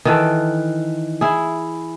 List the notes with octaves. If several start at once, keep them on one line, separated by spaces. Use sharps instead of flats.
D#3 E3 A4
E4 G#4